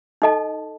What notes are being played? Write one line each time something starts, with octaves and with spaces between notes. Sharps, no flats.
D#4 A4 D#5 A5